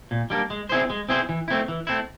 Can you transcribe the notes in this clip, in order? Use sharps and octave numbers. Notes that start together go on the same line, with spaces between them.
A#2
G3 A#3 D4
G#3
C4 E4 G#4 C5
G#3
C4 E4 G#4 C5
E3
A3 C4 E4
E3
A3 C4 E4